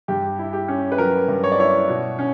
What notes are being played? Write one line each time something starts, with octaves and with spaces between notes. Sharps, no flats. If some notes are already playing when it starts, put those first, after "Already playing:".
G2 G4
E4
G4
C#4
B4
F#3 A#4
G2
C#5
D5
E4 C#5
B2
C#4